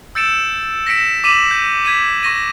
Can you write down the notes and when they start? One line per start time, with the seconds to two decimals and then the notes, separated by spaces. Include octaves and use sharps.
0.15 E6 G6 A6 C#7 D7 E7
0.87 A#6 B6 C#7 D7 E7
1.24 D6 B6 D#7 E7 F#7
1.51 G6
1.85 G#6 B6 D#7
2.23 C#6 A#6 D#7